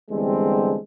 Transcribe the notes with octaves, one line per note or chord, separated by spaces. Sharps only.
E2 D3 G3 G#3 C4